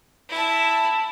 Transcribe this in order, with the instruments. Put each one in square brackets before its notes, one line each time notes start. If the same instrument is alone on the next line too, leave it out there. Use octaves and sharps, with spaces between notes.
[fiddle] E4 A5